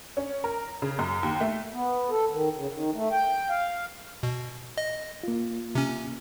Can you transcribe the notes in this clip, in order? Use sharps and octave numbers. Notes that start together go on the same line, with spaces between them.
C#4
A#4
C#3
F#2
D#2
A3
B3
A4
D#3
C#3
D#3
A3
G5
F5
B2
D#5
A#3 F4
C3 C#4